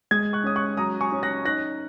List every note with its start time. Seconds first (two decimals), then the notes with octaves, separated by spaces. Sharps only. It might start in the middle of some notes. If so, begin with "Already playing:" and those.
0.11 G#3 D#6 G#6
0.33 C#6 F#6
0.44 C#4 D#6
0.56 C#6 F#6
0.77 F#3 A#5 D#6
1.01 G#5 C#6
1.12 C#4
1.23 F#6 A#6
1.45 D#4 F#6 A#6